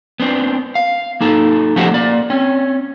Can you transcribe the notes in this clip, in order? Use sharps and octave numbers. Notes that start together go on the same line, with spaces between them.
B3 C4 D4
F5
A#3 D#4 A4
F3 A3 C#4 F#4 G4 C5
A#3 D5
C4 C#4